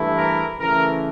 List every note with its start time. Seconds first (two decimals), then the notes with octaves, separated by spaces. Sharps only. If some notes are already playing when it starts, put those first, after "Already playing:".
Already playing: G2 E3 A3 E4
0.17 A#4
0.59 C#3 E3 A3 A#4